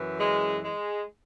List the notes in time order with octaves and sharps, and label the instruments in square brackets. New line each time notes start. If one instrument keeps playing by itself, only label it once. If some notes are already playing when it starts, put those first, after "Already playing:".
Already playing: [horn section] F#2 E3
G#3
G#3